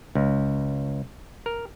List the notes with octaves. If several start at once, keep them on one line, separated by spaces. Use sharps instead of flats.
C#2
A#4